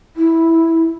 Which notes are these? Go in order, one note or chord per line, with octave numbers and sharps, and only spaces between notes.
E4